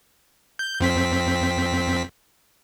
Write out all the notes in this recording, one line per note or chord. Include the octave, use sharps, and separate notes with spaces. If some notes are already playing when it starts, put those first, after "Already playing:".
G6
F2 C4 B6